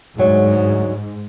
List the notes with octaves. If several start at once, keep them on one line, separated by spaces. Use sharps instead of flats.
D2 G#2 F#3